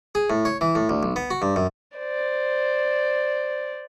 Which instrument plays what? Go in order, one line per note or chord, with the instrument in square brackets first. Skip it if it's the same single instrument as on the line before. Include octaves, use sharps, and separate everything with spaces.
[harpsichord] G#4
A2
C#5
E3
A2
D2
B1
B3
F#4
G2
F#2
[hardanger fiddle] C5 D5